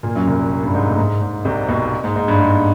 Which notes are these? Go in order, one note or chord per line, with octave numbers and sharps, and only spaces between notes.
A#2 A#3
F#2 F#3
C2 C3
G2
G#2
A2
G#2
G#2
C2 C3
B1 B2
G#2
G#2
G2
G#2